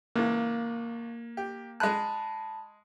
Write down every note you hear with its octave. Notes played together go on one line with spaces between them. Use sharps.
C#2 E3 A#3
G4
G#3 A5 B5 F#6